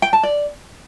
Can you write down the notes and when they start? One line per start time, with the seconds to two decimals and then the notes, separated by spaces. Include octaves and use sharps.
0.02 G5
0.13 A5
0.23 D5